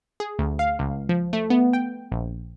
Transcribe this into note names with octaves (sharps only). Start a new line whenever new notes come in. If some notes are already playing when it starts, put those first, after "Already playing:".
G#4
D2
F5
C#2
F3
A3
B3
G5
A#1